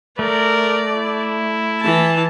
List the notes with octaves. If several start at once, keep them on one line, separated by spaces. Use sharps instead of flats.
A3 A#4 D5
E4
E3 A5